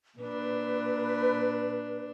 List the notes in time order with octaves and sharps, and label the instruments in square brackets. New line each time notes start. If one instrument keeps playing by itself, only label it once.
[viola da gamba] A#2 D4 [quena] B4